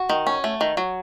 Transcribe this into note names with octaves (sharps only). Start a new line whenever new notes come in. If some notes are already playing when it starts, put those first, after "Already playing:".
Already playing: F#4
D#3
C#4
A3
D#3
F#3